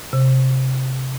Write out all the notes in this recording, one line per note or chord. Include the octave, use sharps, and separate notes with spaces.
C3